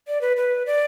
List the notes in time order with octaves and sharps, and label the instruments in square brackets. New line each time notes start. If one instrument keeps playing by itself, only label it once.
[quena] D5
B4
B4
D5